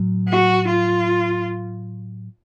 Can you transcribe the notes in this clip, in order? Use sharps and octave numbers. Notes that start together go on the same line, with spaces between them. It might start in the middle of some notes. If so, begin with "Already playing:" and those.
Already playing: A2 F#3
F#4
F4